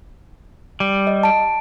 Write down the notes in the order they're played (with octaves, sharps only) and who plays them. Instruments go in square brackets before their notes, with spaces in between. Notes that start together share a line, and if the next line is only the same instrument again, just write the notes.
[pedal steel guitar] G3
[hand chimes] D#5
A5 D7